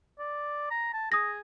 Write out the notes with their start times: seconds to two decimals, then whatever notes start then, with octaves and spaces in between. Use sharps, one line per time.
0.19 D5
0.71 A#5
0.94 A5
1.12 G#4 D#6 A#6